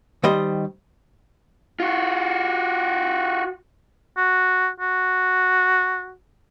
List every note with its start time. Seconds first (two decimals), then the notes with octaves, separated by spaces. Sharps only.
0.24 D#3 G3 C5 D#5
1.80 F4 F#4
4.17 F#4
4.80 F#4